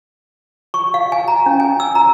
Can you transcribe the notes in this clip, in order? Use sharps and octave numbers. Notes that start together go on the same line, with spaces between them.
C#6
F5
G#5
A#5
C#4
G#5
E6
A#5